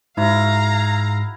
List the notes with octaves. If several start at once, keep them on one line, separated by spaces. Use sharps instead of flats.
G#2 E4 F#4 F5 A#5